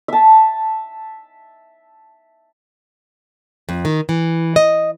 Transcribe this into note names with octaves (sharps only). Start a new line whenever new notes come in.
E5 A5
F2
D#3
E3
D#5